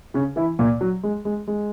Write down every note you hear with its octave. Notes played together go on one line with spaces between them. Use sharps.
C#3 C#4
E3 E4
A#2 A#3
F#3
G#3
G#3
G#3